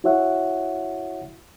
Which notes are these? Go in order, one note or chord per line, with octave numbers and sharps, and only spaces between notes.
E4 F#4 C#5 E5 F#5